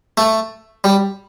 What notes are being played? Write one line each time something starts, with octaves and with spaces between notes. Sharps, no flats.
A3
G3